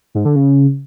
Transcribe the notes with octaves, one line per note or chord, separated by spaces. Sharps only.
G#2
D3
C#3